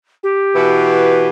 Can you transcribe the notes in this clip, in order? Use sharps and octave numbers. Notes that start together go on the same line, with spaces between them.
G4
B2 E3